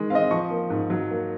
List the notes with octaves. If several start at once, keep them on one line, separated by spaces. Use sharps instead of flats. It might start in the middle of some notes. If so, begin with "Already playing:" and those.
Already playing: D#3 G#3 G#4
C4 D#5 F5
F3 C#6
A#3
G#2
F#3
A#3